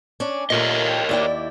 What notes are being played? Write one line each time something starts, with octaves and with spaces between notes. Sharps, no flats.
C#4 D4
A#2 A3 A#4 C#5 D#5
G5
D#2 E4 D5 G5